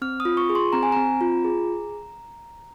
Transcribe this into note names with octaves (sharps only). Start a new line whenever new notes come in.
C4 F6
D#6
F4
C#6
G#4
C6
C4 A#5
G#5
C4 A#5
F4
G#4